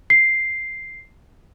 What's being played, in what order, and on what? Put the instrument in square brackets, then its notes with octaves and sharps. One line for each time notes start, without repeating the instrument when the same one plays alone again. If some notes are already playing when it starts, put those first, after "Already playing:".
[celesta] C7